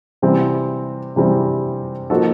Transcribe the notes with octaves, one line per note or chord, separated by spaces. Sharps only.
C3 E3 G3 C4
C3 E3 G3 C4
F3 A#3 D#4 F#4 A4